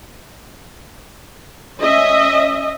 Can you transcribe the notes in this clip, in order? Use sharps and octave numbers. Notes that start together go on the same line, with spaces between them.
C#4 D#5 E5